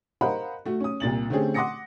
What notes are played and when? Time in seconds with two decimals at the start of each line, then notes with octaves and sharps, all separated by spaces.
0.21 A#4 C5 D#5 F5 F#5 B5
0.66 A3 F#4
0.80 C#4 D#6
1.00 C2 A#2 A6 F#7
1.30 D3 A3 C4 C#4 G4 G#4
1.54 F#5 C6 D6 D#6 A#6 C#7